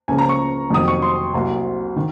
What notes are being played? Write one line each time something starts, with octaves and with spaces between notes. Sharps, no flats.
C#2 C#3 F3 A#3 C#4 G#5
A#5
C#6
F2 C3 D#3 F#3 A#3 D#6
C#6
C6
C2 C3 F#3 A#3
D#3